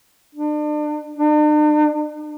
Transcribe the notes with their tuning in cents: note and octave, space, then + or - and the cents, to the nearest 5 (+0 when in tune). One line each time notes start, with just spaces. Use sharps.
D4 +35
D4 +45